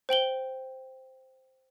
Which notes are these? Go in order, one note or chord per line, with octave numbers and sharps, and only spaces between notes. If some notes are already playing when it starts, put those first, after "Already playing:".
C5 G5 F#7 G7